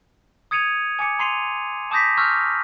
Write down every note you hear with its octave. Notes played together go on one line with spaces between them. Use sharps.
D#6 G#6 C#7 D#7 F7
G#5 D6 C#7
A#5 C6 C7 D#7 F7
A5 D6 D#6 G6 A#6 B6
A#5 C#6 E6 F6 G6